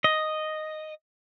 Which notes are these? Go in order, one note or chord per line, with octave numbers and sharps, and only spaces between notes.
D#5